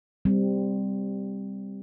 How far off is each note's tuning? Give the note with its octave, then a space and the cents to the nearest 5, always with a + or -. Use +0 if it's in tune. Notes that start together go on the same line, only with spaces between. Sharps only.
G3 +10 C4 -10